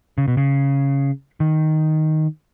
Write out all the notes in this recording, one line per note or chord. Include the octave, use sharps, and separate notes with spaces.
C#3
B2
C#3
D#3